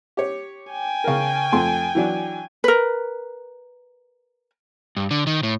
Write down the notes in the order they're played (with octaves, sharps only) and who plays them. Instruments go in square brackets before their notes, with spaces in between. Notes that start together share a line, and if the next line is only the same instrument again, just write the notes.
[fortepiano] G4 C#5
[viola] G5 G#5
[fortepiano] C#3 A#4
F2 A3 C6
E3 F#3 D4
[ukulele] A#4 B4
[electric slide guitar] G2
D3
D#3
A2